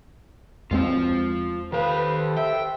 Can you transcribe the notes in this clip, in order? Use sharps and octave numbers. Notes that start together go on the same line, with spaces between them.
E2 G#3 C4 F4 C5
D#3 G4 A4 B4 C5 F5
E5 G5